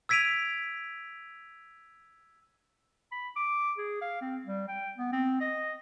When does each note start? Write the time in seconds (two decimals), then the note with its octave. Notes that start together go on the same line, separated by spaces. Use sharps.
0.09 E6 G#6 B6 D7 D#7 F7
3.12 B5
3.36 D6
3.78 G#4
4.02 F5
4.21 C4
4.45 G3
4.68 G5
4.98 B3
5.13 C4
5.41 D#5